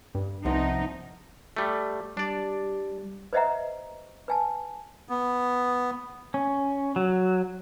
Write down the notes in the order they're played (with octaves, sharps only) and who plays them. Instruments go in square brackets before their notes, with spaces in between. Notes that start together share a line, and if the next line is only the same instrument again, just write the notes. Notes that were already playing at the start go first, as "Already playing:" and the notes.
[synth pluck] G2
[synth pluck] C2 [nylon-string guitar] C3 F3 B3 [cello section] D#4
[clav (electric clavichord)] G3 A3
[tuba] G3 [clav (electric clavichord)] D4 D5
[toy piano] B4 C5 D#5 E5 F#5 A#5
B4 G#5 A5
[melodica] B3
[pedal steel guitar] C#4
F#3